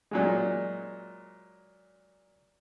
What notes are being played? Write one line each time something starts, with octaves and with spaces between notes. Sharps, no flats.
A#2 F#3 G#3